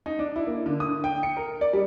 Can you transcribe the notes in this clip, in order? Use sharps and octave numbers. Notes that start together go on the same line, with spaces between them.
D#4
D4
E4
A#3
D3
D#6
G5
C#7
A#4
D5
G3